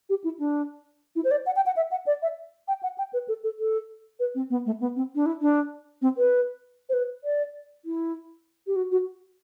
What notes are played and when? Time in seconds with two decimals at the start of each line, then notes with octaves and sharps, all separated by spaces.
0.09 G4
0.24 E4
0.39 D4
1.16 E4
1.24 C5
1.31 D5
1.46 F#5
1.56 G5
1.66 F#5
1.76 E5
1.91 F#5
2.06 D5
2.22 E5
2.68 G5
2.83 F#5
2.98 G5
3.13 B4
3.28 A4
3.44 A4
3.59 A4
4.20 B4
4.35 C4
4.50 B3
4.66 A3
4.81 B3
4.96 C4
5.15 D4
5.26 E4
5.41 D4
6.02 C4
6.18 B4
6.89 C5
6.94 B4
7.24 D5
7.85 E4
8.67 G4
8.76 F#4
8.91 F#4